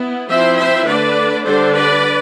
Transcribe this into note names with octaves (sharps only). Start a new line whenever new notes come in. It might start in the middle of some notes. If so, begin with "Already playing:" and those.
Already playing: B3 E4
F3 C4 E4 C5 E5
C5 E5
D3 A3 D4 B4 D5
D3 G3 D4 A4 C5
B4 D5